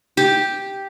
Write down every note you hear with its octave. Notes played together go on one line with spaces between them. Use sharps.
G4